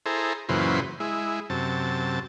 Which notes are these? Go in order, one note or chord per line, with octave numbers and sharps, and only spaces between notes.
E4 G#4 A4 C5 A#5
F#2 A#2 C#3 E3 B4 C5
G#3 E4
F#2 C3 A5